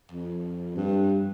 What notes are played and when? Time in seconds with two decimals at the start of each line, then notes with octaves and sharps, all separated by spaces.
0.11 F2
0.76 G2